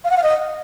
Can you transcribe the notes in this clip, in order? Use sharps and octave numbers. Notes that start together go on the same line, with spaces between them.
F5
F#5
F5
D#5